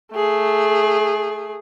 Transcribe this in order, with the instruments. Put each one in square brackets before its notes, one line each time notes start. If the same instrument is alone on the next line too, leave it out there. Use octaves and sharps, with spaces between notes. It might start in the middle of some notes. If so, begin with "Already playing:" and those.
[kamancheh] A3 G#4